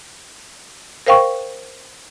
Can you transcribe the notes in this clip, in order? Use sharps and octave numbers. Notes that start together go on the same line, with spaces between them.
A#4 C5 F5 G5 C#6